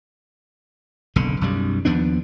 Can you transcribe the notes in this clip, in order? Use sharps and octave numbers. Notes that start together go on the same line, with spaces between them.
F#1 B1 D3
B1 F#2 G3
D#2 F3 B3 D4